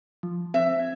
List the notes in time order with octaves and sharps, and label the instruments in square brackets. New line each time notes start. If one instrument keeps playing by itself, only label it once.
[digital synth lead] F3
[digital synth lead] C4 [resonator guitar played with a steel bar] E5
[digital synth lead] G#6